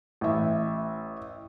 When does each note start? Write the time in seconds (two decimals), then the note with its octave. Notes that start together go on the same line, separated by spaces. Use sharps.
0.21 A1 E5